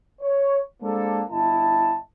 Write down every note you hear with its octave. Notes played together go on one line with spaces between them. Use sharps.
C#5
G#3 A#3 C4 D4 A4
G1 E4 D#5 A5